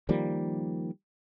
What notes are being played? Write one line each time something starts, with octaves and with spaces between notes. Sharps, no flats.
D#3 F3 G3 A#3